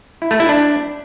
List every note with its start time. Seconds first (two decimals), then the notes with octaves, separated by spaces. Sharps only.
0.22 E4
0.31 A3
0.40 E4
0.49 D4